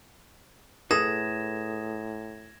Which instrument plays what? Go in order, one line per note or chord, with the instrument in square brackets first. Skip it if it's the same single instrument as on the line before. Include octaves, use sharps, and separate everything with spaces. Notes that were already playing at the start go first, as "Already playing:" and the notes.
[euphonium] A2 [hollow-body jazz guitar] G#4 A4 B4 [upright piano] D#6 [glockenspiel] G#6 A#6 E7